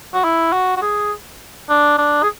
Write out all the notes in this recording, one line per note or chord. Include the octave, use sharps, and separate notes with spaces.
F#4
E4
F#4
F#4
G#4
D4
D4
G#4